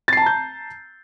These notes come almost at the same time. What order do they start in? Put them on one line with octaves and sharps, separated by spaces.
A6 C7 A5 A#5 G6